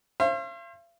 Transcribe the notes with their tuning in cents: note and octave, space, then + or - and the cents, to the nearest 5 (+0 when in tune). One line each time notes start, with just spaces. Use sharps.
C5 +35 F5 -45